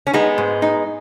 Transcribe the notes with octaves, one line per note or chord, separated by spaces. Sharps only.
C#4
G#3 B3 D#4
G#2
D#4